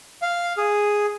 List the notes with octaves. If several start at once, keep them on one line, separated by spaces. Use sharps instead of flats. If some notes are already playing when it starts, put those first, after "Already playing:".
F5
G#4